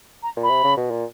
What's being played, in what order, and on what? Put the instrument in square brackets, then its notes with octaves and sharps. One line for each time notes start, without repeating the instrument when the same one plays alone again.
[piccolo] A#5
[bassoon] A#2
[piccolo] B5
[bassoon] C3
C#3
B2
A#2